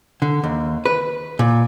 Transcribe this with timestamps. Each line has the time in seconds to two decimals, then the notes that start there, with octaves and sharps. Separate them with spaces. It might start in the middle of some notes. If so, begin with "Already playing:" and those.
0.22 D3
0.44 D#2
0.86 B4
1.39 A#2